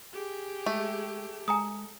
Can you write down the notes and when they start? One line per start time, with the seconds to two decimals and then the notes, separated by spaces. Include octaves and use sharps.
0.12 G4 G#4
0.66 G#3 A3
1.48 G#3 G#5 A#5 D#6